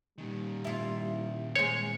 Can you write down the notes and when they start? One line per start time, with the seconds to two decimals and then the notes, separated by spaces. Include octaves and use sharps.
0.18 A#2 D#3 G3
0.65 E4 F4
1.56 G#3 C5 C#5